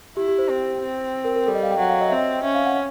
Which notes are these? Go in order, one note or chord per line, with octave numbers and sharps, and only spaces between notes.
E4 G4
G4
C5
C4 C5
C4
A#4
A#4
G3 A4
D#5
F5
G5
F#3 F#5
F5
D#5
C4 E5
D#5
C#4 E5
F5
F#5